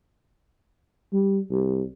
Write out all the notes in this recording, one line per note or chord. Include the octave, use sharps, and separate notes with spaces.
G3
C2